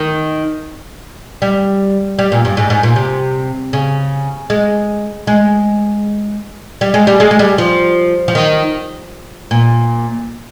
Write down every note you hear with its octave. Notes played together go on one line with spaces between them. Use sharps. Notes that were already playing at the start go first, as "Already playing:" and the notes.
Already playing: D#3
G3
G3
A#2
G2
G#2
G#2
A#2
C3
C#3
G#3
G#3
G3
G#3
G3
G#3
G#3
G3
F3
F3
D#3
A#2